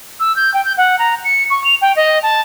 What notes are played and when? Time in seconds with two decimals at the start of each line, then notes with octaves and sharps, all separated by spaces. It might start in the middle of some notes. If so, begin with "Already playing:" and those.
0.20 E6
0.36 G6
0.54 G5
0.65 G6
0.77 F#5
0.99 A#5
1.24 C#7
1.50 C#6
1.64 F7
1.82 G5
1.96 D#5
2.23 A5